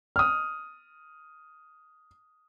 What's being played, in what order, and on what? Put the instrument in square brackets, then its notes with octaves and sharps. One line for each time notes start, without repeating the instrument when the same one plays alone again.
[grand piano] D#6 F6